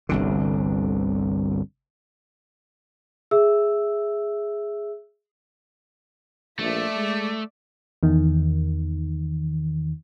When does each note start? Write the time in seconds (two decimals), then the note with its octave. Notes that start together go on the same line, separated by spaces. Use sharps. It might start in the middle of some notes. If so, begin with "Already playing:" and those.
0.09 G1 C2 D3
3.31 G#4 E5 E6
6.59 A#1 A3 D5 E5
6.96 G#3
8.03 E2 D#3